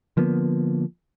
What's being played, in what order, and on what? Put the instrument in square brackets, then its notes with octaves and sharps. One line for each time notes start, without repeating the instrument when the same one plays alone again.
[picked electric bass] D3 F3 A#3 B3